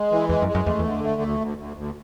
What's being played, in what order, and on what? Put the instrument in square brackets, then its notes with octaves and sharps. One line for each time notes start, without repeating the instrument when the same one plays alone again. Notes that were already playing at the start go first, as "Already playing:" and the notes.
Already playing: [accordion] G#3
E3
[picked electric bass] E2 [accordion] G#3
[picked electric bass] F#2
[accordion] G#3
[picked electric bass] F#2
[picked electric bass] E2 [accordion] A3
[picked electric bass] E2
[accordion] D3
A3
D2
D2
D2
D2